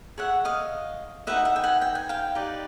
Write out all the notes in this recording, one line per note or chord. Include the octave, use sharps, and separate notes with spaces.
G#4 C#5 E5 F#5
D#5 F5
D#4 G4 B4 D#5 E5 F#5
E5 F#5
G5
F#5 G#5
G5
G#5
F5 G5
D#4 G4 B4 D5